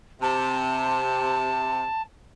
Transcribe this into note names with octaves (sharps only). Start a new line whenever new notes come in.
C3 A5